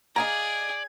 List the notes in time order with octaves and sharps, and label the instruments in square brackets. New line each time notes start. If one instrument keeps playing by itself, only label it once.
[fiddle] G#4 [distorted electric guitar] D5 [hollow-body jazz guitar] D#5 F5 A#5 [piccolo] G#6